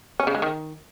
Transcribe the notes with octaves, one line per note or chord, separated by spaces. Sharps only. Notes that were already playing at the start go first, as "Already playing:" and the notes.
C#4
C#3
G#3
D#3